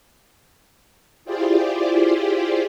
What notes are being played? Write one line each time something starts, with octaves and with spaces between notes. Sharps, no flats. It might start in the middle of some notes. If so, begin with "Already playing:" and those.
E4 F4 G4 G#4 C5 D5